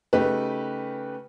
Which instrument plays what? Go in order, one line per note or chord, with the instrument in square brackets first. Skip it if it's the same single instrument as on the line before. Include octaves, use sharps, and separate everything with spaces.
[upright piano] C#3 A3 D#4 G4 B4